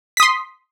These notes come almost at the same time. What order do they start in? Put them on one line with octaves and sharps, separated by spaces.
B6 D#6 C6